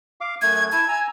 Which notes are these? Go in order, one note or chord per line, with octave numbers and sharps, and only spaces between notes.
F5 D6
F#2 A3 G#6
E4 A5 G#6
G#5 A#5 E6